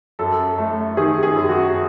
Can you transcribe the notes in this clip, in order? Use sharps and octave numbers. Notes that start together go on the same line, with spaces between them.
F#2 A4
A3
D#3 G#4
G#4
F#2
F#4